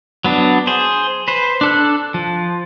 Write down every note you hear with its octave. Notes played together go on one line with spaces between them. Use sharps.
F#3 B3 D4
G#4 C5
B4 C5
D4 A4 F#6
F3